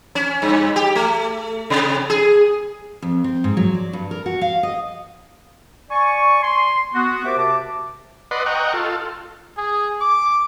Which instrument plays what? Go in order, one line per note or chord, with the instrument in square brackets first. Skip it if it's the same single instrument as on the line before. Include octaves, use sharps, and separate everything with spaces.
[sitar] C#4
G2
G4
A3
C3
G#4
[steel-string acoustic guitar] F2
C4
G#2
F#3
D5
G2
A#4
F#4
F5
D#5
[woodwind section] D5 G#5 C#6
C6
B3 F#4
G4 A#4 C5 E5 D6
C3 F#4 E5 A5 D6
[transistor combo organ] B4 D5 D#5 F#5 C6
D#5 F#5 G5 A#5 C#6
F4 A4
[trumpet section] G#4
D6